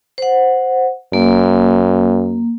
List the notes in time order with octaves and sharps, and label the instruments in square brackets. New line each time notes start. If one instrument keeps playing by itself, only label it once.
[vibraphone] C5 F#5
[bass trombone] F#2 [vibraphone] A#3